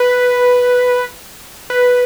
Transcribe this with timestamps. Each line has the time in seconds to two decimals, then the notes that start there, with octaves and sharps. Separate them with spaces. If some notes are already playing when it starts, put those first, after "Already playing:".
Already playing: B4
1.70 B4